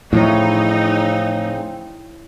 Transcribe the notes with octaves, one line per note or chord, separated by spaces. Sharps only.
A2 C#3 F3 C4 D#4 E4 C#5